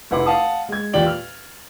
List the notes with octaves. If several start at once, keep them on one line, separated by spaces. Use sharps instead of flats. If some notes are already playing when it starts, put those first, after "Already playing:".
F1 E4 B4 F#5 C6 D6
F5 F#5 A5 D#6
G#3 G#6
E2 A#2 G4 D5 G5 F#7
F6